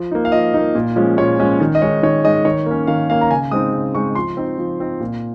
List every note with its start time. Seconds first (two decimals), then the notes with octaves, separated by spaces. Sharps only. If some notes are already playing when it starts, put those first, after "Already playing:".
Already playing: F3
0.11 A#3 D#4
0.25 F5
0.32 F3 D#5
0.54 A#3 D#4
0.75 A#2
0.96 F3 G#3 C#4
1.17 A#2 C#5
1.39 F3 G#3 C#4
1.60 D#3
1.75 D#5
1.82 G#3 D#4 C#5
2.03 D#3 C#5
2.24 G#3 D#4 D#5
2.45 D#3 C#5
2.66 A#3 C#4
2.87 D#3 F5
3.09 A#3 C#4 F5
3.21 A#5
3.31 C#3 G#5
3.51 G#3 C4 D#4 D#6
3.73 C#3
3.95 G#3 C4 D#4 C#6
4.15 F3 C6
4.37 C4 D#4
4.58 F3
4.80 C4 D#4
5.00 A#2